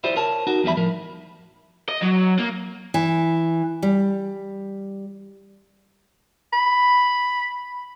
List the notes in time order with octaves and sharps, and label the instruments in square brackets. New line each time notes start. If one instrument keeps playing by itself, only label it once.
[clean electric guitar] E4 F4 G4 C5 D5
A#4 C#5 A5
D#4 F#4 A#4
E2 F3 G3 E5 B5
A2 F3 A#4
[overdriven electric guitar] D#5
F#3
A#3
[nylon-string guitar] E3
G3
[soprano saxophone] B5